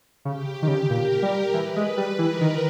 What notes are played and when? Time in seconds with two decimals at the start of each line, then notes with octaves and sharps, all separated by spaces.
0.25 C#3 G4
0.62 D#3
0.68 C#3
0.89 A#2 A#4
1.22 G3
1.54 E3 B4
1.76 G#3
1.97 G3
2.19 E3 A#4
2.41 D#3